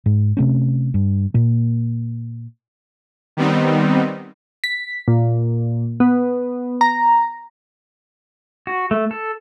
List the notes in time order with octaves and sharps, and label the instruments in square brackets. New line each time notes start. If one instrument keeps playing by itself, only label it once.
[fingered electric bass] G#2
C3 A3 C#4
G2
A#2 A#3
[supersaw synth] D#3 G3 B3 C4 D#4
[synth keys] B6
A#2
B3
A#5
[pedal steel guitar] F#4
A3
A4